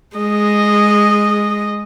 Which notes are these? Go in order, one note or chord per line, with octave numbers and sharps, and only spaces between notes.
G#3 D#5